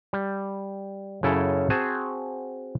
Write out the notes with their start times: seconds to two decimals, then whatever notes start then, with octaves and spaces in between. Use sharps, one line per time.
0.13 G3
1.23 F#2 C#3 E4 A4 G#5
1.70 C4 F#4 G#4 C5 G#5 A5